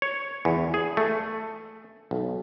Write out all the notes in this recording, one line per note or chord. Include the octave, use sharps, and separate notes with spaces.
C#5
E2
G#4
A3
B1